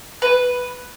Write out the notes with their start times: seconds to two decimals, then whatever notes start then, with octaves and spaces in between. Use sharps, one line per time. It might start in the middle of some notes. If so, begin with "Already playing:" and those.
0.22 B4